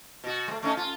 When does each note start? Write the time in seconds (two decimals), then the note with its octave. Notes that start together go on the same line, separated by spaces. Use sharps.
0.24 B2 F#4
0.48 G#3 A3
0.63 A3 C#4 D#4
0.77 F4